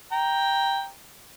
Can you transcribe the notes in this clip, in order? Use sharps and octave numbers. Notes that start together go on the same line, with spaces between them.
G5 A#5